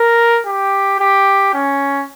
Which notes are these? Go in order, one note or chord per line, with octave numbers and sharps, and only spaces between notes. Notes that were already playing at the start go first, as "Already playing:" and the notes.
Already playing: A#4
G4
G4
C#4